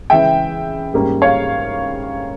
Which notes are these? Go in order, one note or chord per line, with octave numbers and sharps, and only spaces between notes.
C#3 E3 G#3 E5 G5
G#2 G3 A#3 C#4
C#5 F5